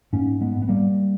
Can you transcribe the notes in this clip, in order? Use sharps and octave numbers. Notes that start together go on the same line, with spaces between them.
G#2 A#3 C#4
G#3 B3
B3
G3 A#3